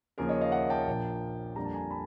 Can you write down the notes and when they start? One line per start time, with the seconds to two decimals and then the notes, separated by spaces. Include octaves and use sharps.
0.18 D#2 C#3 F3 A#3 G#4 A#4
0.29 C#5 D#5
0.41 D#5 F5
0.52 E5 F#5
0.70 G5 A5
0.87 A#1 A#2 F3 A#3
1.56 F2 D3 G3 A#3 A#5
1.65 A5
1.74 G#5 A#5
1.90 A5 B5